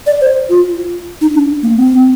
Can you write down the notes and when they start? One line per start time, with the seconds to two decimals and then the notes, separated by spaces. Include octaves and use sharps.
0.07 D5
0.21 C5
0.50 F4
1.21 D#4
1.34 D4
1.63 A#3
1.77 C4